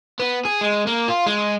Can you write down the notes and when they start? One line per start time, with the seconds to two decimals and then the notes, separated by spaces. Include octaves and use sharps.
0.19 B3
0.45 G#4
0.61 G#3
0.87 A#3
1.08 F4
1.26 G#3